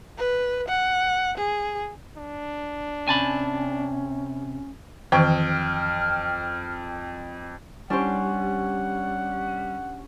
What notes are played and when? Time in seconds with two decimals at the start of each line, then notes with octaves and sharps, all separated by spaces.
0.18 B4
0.68 F#5
1.38 G#4
2.17 D4
3.08 C3 C#4 G#5 A5 B5
5.12 F2 D#3 E3 G5 F6
7.90 G3 C#4 D4 G4 C5 F#5